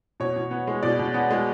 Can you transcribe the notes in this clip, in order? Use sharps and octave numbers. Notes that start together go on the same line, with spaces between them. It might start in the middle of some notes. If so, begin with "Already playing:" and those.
B2 C#5
B2
B3
G#3
B2 D5
B2
B3
G#3